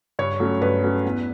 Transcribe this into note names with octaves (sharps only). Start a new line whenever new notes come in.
G2 C#5
F#3 A3 C#4
G2 B4
F#3 A3 C#4
E2